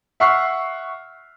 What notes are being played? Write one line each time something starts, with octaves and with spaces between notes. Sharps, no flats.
E5 F#5 C#6 F6 C7